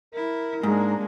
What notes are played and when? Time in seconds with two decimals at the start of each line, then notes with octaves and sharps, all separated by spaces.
0.14 E4 A#4
0.63 G#2 G#3 A#3 D4